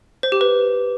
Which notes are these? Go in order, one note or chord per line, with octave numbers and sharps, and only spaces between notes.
C5
G4
B4